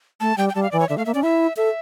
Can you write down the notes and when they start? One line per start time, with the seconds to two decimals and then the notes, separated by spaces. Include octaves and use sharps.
0.20 A3 A5
0.37 G3 G5
0.49 G5
0.55 G3 A5
0.63 F5
0.71 E3 D5
0.80 C#5
0.89 D3 E5
0.97 A3 F5
1.05 A#3 E5
1.14 C#4 D5
1.23 E4 E5
1.57 A4 E5